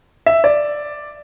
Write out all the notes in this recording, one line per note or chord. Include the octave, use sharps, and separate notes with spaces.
E5
D5